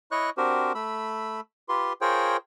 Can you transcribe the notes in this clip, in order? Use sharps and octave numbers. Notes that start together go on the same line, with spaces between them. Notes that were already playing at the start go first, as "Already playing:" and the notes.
E4 C#5 D#5 C#6 F#6
C4 D4 F#4 G4 A#4 C5
A3 B5 E6
F4 G4 B4 C6
F4 G#4 A#4 C5 C#5 G5